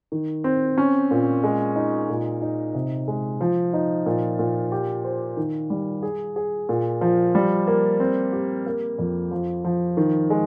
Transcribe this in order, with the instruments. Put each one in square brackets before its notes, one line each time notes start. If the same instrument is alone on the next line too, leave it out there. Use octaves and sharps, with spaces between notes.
[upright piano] D#3
C4
C#4
A#2
G#3
D#4
A#2
D#4
C3
G#3
F3
D#4
A#2
A#2
G4
C5
D#3
G3
G#4
G#4
A#2
F3
G3
A#3
C4
G4
A#3
F2
F3
F3
D#3
G#3